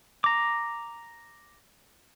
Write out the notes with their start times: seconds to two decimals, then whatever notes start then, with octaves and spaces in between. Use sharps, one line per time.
0.24 A#5 D6